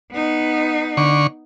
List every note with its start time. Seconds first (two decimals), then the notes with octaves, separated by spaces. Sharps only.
0.12 B3 D#4
0.97 D3 C#6